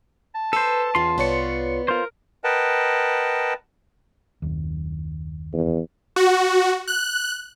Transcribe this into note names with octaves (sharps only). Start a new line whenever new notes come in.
A5
A4 B4 C5
E2 C#4 F4 C6
C2 B3 C#5 D5 C#7
F4 A#4 C5
A#4 B4 D#5 F#5 G5 A5
F#1 D#2
E2
F#4
F#6